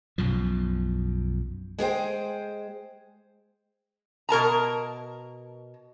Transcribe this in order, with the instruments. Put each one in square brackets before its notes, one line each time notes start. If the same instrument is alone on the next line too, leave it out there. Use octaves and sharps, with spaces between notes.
[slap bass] B1 F#2 B2 F3
[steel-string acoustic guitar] G#3 G#4 C5 G5
[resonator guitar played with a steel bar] B2 A#4 A5 A#5